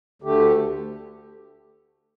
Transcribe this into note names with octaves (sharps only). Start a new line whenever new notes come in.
D2 D3 A3 G4